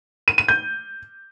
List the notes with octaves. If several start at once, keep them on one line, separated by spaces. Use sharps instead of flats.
D#7
D#7
G6